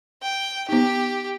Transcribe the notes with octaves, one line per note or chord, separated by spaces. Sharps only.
G5
B3 D#4 G4